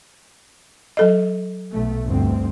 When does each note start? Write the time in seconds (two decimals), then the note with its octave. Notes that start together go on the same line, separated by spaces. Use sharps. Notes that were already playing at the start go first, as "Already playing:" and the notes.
0.97 F#3 A4 D#5
1.72 B1 A3
2.05 G1 D2 C4